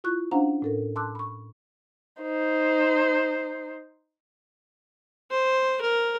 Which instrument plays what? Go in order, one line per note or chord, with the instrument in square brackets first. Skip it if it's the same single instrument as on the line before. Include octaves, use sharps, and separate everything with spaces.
[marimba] E4 F4 C#6 F#6
C#4 D4 C5 F5 F#5 A#5
A2 A4 A#4
A5 C6 D6 E6 F#6
B5 C#6
[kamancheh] D#4 C5
[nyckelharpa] C5
A#4